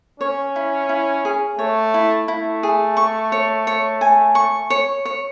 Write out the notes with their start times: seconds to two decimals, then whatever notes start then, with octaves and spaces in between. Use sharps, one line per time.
0.20 C#4 C#5
0.56 E4
0.89 E4
1.25 G#4
1.59 A3 C#5
1.94 E4
2.28 A3 E4
2.63 G#4
2.97 C#6
3.32 C#5
3.67 C#5
4.01 G#5
4.35 C#6
4.70 C#5
5.05 C#5